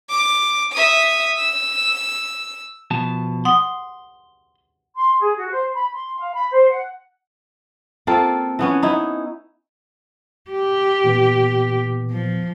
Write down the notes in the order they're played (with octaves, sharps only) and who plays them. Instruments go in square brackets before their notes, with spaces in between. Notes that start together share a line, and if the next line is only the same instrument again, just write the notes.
[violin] D6
E5 D#6
E6
[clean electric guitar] B2 F3 A5
[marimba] F#5 D#6 [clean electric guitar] C6
[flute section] C6
G#4
F#4
C5
B5
C6
F5
B5
C5
F#5
[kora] A#3 C4 F4 A4
E3 B3 C#4
D#4 E4
[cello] G4
[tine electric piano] A#2 E3 B3
[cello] F3